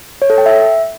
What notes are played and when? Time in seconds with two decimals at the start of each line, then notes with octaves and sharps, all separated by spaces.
0.22 C#5
0.30 A4
0.38 G5
0.46 E5